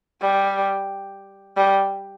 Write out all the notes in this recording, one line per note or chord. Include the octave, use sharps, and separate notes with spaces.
G3
G3